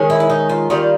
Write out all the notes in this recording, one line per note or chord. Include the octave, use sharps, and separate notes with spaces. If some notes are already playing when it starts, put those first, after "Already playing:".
Already playing: D#3 G#3 C#4
E4
E4
D#4
F4
D#3 G3 A#3 F4